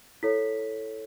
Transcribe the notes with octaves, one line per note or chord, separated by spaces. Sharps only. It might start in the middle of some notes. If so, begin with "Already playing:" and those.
E4 A4 C#5 B6